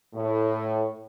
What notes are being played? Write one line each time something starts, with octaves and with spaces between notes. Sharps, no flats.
A2